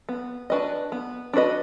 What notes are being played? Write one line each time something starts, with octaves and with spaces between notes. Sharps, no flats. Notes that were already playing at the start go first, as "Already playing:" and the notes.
B3
D4 F#4 B4 D#5
B3
D4 F#4 B4 D#5